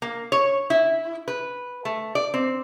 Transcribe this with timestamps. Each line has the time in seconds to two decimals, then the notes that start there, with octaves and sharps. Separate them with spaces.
0.02 A#3
0.32 C#5
0.70 E4
1.28 B4
1.85 A3
2.15 D5
2.34 C4